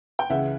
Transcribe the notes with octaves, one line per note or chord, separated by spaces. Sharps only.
G5
C#2 C#3 E3 E5 F#5